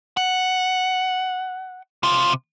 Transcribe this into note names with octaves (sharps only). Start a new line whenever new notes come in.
F#5
C3 F4